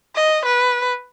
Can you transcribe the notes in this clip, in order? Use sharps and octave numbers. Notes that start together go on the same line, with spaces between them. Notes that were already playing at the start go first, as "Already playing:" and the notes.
D#5
B4